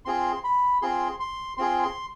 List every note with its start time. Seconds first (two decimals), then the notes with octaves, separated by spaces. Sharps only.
0.05 C4 F4 G#4 C6
0.44 B5
0.82 C4 F4 G#4 C6
1.20 C6
1.57 C4 F4 G#4 C6
1.83 C6